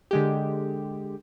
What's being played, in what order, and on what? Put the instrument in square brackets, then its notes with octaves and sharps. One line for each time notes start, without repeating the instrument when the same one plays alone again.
[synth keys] D3 G#3 G4